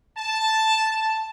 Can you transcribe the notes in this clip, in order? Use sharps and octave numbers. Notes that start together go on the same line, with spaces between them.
A5